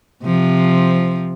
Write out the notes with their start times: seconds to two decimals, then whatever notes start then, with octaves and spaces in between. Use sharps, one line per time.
0.24 C3 F3